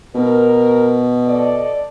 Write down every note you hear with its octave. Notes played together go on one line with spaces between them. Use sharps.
B2 A#4
A4 D5 D#5